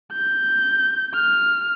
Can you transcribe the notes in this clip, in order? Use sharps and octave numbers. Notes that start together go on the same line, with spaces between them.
G6
F6